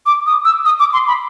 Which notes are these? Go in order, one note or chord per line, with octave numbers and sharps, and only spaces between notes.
D6
D#6
E6
D#6
D6
C6
B5